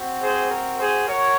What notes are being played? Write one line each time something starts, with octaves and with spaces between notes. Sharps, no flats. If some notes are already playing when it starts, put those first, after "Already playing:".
Already playing: C4 F#4
G#4 C5
A#4
G#4 C5
F#4 A#4 C#5